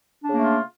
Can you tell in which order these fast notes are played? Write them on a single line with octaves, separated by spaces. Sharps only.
D4 C#3 A#3 A3 F4